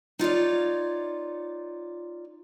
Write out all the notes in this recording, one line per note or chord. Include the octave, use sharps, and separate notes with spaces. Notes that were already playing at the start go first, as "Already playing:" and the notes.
D#4 F4 C#5 D5